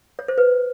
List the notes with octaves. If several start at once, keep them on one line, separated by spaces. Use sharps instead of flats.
C#5
C5
B4